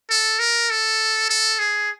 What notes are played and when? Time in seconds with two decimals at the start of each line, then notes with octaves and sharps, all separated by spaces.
0.10 A4
0.39 A#4
0.70 A4
1.29 A4
1.59 G#4